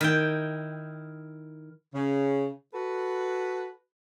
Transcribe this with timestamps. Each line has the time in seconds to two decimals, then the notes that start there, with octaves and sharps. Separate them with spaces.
0.01 D#3 E4 G5
1.94 C#3
2.74 F#4 A4 B4